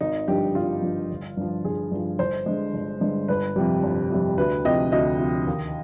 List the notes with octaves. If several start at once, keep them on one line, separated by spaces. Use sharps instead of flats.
G#1 D#4
G2 D3 F3 G4
G#1 F4
G2 D3 F3
G1
G2 F3
G1 G#4
G2 F3
G1 C5
G2 D3 G#3
G1
G2 D3 G#3
G1 B4
F2 C3 G3
G1
F2 C3 G3
D2 B4
C3 F3 D#5
D2 D#5
C3 F3
D#2